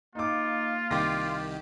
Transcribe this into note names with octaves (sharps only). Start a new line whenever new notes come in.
A#3 D#4 F4 D6
C2 D#3 G4 C6 D6 A#6